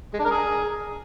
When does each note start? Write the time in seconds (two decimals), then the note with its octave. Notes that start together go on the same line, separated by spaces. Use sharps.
0.14 G#3
0.19 D4
0.25 A#4
0.31 G#4